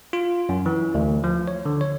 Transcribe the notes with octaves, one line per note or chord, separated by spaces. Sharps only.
F4
F#2
E3
D2
F3
C#5
D3
C#5